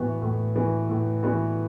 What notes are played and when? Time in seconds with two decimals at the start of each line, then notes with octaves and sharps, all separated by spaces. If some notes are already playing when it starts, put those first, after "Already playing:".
Already playing: A2 E3 B3 F#4
0.22 A2
0.55 E3 B3 F#4
0.89 A2
1.23 E3 B3 F#4